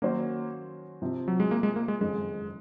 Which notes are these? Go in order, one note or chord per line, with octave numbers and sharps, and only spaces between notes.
D#3 F#3 A#3 C#4 F#4 C5
C3 F3 C4
F#3
G#3
A#3
G#3
A#3
G#3
F#1 F2 D#3 G#3